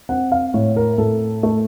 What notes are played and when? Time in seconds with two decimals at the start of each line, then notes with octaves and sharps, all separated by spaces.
0.09 C4 F#5
0.32 F5
0.54 A2 C#5
0.76 A#4
0.98 A2 A4
1.43 A3